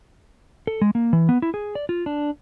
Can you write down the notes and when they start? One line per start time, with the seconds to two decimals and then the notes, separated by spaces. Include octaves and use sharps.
0.67 A4
0.81 G#3
0.95 A#3
1.13 E3
1.29 B3
1.42 E4
1.54 G#4
1.75 D5
1.89 F4
2.06 D4